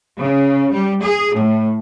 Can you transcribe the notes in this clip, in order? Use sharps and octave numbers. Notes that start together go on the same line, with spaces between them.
C#3
G3
G#4
A2